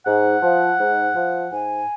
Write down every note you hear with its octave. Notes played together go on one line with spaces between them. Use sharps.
G#2 F#5
F3
G#2
F3
G#2 G#5